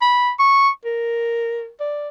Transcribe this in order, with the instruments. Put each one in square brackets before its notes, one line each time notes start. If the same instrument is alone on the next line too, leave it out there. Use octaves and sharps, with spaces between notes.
[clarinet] B5
C#6
A#4
D5